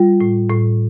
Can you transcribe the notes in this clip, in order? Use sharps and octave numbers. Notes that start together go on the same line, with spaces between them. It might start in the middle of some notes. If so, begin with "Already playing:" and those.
Already playing: G3 F4
A2
A2